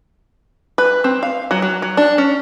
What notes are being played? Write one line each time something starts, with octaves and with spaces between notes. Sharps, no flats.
B4
C4
F5
F#3
F#3
F#3
D4
C#4